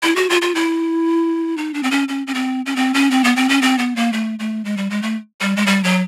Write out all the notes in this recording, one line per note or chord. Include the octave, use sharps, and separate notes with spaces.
E4
F#4
F4
F4
E4
D#4
D4
C4
C#4
C#4
C#4
C4
C#4
C4
C#4
C4
B3
C4
C#4
C4
B3
A#3
A3
A3
G#3
G3
G#3
A3
G3
G#3
G3
F#3